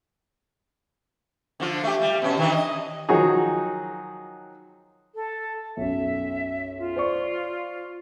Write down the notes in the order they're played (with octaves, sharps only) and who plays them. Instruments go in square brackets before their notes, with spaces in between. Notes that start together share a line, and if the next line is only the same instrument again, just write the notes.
[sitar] D3 F3 F4
A3 G4
G3
B2 C#4
D#3 E3 D4
D#5
[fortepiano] D#3 F3 F#3 D#4 F#4 G#4
[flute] A4
[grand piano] B1 F#2 [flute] E5
[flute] F4
[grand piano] C5 D5 C#6